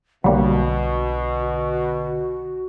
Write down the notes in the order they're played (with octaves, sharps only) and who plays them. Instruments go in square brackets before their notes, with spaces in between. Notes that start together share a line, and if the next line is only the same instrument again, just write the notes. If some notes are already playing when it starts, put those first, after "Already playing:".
[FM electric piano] B1 D3 [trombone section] B2 [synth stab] F#3 G3 A#3 [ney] F#4